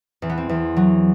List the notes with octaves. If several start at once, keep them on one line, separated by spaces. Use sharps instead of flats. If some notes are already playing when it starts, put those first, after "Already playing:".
E2 C4
B3
C4
E2
F#3